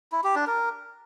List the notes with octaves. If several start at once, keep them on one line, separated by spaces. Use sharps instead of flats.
E4
G4
D4
A#4